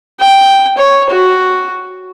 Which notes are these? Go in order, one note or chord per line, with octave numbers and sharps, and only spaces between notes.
G5
C#5
F#4